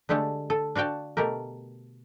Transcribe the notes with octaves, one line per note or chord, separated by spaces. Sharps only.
D3 G#3 A3 G4 A4
A4
D4 F#4 F5 G5 A5
B2 A3 G4 A#4